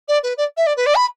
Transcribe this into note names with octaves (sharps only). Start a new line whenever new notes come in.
D5
B4
D5
E5
D5
B4
D5
B5